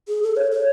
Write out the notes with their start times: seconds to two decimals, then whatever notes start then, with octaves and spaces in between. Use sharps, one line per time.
0.08 G#4
0.23 A4
0.37 C#5
0.52 C#5